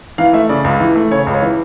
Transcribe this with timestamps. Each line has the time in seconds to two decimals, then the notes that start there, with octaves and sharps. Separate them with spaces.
0.18 E3 F5
0.33 A3 E5
0.49 C#3 D5
0.64 C#2
0.80 E3
0.96 A3
1.11 C#3 C#5
1.27 C#2
1.34 C#5
1.42 E3